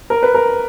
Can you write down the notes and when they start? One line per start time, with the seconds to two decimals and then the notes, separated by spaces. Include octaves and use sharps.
0.10 A#4
0.23 B4
0.34 A#4